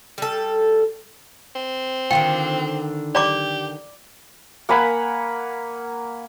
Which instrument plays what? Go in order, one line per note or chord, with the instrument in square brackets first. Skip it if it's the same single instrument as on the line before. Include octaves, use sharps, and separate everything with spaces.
[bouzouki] G3 A4
[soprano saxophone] C4
[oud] D3 D#3 F4 [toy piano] G5
[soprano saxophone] G4 [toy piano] D5 A#5 D6
[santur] A#3 F#5 G#5 B5